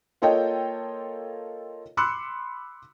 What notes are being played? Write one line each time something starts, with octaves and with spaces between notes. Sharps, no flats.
A#3 F4 A4 C#5 D#5 G5
B5 C6 D6 E6 F#6 C#7